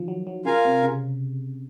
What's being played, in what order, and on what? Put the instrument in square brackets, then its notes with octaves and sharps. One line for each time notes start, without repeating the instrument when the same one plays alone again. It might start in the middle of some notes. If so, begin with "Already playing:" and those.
Already playing: [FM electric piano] D#3 F3
F#3
F#3
[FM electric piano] C#3 [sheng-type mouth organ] F4 A#4 F5 G#5
[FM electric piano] C3
C#3